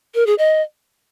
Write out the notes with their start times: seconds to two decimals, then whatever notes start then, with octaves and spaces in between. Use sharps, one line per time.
0.15 A#4
0.27 G#4
0.38 D#5